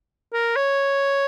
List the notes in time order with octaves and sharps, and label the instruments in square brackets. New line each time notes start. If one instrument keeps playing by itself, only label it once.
[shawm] A#4
C#5